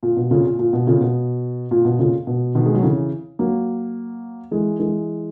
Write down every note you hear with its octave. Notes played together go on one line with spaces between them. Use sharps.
A#2
B2
A#2 C#3
A#2
A#2
B2
A#2 C#3
B2
A#2
B2
A#2 C#3
B2
B2 D#3
G#3
F#3
C#3 E3
F#3 A#3
E3 G#3
E3 G#3